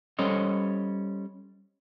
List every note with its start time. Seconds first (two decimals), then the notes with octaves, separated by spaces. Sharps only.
0.19 G3 C#4 A4 C5 C#5 D#5